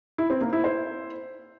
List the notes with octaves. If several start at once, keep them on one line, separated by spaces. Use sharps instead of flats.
E4
C4
A#3
E4
C5